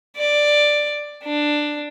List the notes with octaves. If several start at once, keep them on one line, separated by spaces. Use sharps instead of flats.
D5
D4